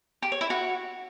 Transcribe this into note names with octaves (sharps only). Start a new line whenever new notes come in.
G4
C#5
E4
F#4